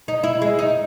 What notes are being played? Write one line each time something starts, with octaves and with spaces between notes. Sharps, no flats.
D#4
E4
G#3
D#4